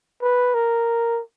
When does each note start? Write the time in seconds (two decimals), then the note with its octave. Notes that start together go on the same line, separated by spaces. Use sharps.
0.22 B4
0.54 A#4